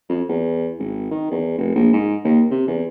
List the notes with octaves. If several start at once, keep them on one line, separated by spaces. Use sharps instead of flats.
F2
E2
G#1
D#3
E2
F1
A#1
G#2
D#2
C3
E2